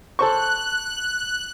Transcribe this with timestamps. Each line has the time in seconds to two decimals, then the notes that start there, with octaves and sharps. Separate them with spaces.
0.19 A4 C5 C#6 F#6